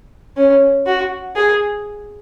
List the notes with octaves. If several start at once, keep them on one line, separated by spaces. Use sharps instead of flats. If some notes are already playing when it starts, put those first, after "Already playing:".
C#4
F#4
G#4